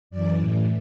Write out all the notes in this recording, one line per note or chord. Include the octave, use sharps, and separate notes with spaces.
F#2 E3 D5
A2 E3